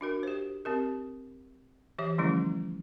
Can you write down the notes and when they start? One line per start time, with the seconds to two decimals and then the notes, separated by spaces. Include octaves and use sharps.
0.01 D4 F#4 A#4
0.23 G4 C5
0.65 C4 G4 A#4
1.98 E3 G4 C#5 E5
2.18 D3 F3 G3 A3 C#4 E4